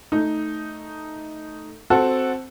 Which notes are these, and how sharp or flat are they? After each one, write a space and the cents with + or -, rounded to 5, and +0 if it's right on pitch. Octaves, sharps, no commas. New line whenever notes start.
A3 +0 D#4 +0
C4 +0 F#4 +0 A4 +0